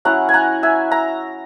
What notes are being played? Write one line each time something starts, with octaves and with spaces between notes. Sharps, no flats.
F#3 C#4 E4 F#5 A#5
G#5
F#5 A#5
E5 G#5
A#5